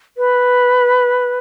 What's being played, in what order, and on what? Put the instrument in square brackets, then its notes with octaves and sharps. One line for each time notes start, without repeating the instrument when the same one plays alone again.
[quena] B4